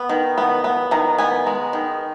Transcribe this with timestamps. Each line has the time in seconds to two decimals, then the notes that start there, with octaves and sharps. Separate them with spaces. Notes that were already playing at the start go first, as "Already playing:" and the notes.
Already playing: B3
0.09 D#3
0.38 B3
0.64 B3
0.91 D#3 A#5
1.18 B3 G#5
1.46 G#3 A#5
1.73 D#3